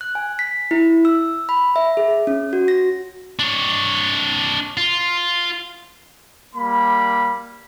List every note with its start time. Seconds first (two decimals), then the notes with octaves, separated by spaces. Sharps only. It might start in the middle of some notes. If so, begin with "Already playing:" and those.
0.01 F#6
0.15 G#5
0.39 B6
0.71 E4
1.05 E6
1.49 B5
1.76 E5
1.97 G#4
2.27 C#4
2.53 F#4
2.68 A#6
3.39 D4 C#5
4.77 F4
6.56 G3 A#3 B5